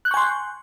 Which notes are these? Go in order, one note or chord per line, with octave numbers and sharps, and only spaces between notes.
G#5 C6 C#6 F#6 G6